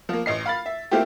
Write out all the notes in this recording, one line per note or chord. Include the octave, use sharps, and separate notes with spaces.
F3 A#3
A1 D#5 C7
F5 B5 A6
E5
A3 A#3 C4 E4 F4 G4